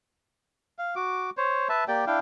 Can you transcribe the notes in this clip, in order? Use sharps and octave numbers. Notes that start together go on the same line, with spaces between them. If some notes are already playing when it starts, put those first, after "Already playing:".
F5
F#4 D6
C5 C#5
B4 E5 A5
A#3 G4 D5 G5
D4 E4 F5 G5